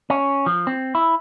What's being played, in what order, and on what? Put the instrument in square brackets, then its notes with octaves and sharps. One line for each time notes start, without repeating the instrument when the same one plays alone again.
[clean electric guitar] C#4
F3
C4
E4